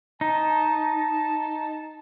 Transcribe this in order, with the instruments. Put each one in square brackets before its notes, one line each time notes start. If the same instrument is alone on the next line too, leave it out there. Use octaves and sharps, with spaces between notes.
[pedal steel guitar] D#4 [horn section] A5